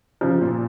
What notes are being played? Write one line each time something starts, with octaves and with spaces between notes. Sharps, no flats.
C#3 F3
A#2